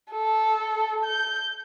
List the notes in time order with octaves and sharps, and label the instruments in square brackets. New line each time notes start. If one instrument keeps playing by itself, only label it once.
[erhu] A4
G6